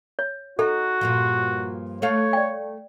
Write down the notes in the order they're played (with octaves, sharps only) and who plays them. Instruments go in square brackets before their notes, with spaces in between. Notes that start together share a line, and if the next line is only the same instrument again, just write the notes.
[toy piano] C#5
[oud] D#4 [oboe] F#4 [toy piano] A4
[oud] G2 A#2 F3
[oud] A3 A4 F5 [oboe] C#5
[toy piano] D5 G5